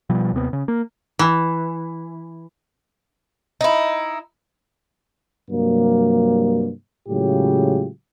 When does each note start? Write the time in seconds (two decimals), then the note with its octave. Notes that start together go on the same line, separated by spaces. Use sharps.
0.10 B2 F3 G3
0.33 D#2 C3 G#3 B3
0.53 C#3
0.68 A#3
1.19 E3
3.61 D#4 E4
5.50 G2 C3 F#3 G3 A#3
7.09 A2 C#3 F#3 G#3 F4 G4